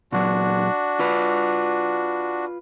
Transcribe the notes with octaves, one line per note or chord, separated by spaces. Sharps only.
A#2 F#3 D4 F#4
F4 B4